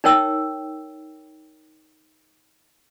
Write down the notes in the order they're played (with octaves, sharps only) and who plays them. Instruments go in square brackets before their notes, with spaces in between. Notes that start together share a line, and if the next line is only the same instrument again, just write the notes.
[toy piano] D#4 A#4 C#5 G5 E6